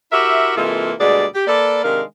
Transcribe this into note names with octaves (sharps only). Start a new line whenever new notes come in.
E4 F#4 G4 A#4 E5
C3 E3 G#3 A#3 F4 A4
D2 B2 G3 G#3 G#4 D5
G4
A#3 A4 B4 D5
C3 D#3 G#3 D4 A#4 F5